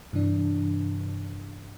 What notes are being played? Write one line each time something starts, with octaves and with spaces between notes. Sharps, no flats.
G2 C3 E3 D4